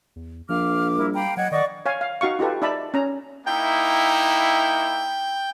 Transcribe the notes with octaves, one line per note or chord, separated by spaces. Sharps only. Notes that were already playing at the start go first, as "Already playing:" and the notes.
E2
A#1 F3 F5 D6 F6
G3 E4 A#4
F5 G5 A#5 B5
F#3 D#5 F#5 G#6
D#3 D5 D#5 F#5 C#6
C#5 F5 G#5
F5
D#4 F#4 F5 C#6
D#4 F4 G4 A4 B4
D#4 D5 E5 A5 B5
C#4 A#5
A#3 D#4 E4 G5